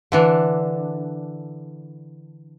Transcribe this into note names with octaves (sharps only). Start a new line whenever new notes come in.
D3 E3 D4